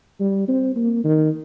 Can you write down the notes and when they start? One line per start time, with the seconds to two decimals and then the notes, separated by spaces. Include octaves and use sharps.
0.20 G3
0.48 C4
0.76 A#3
1.05 D#3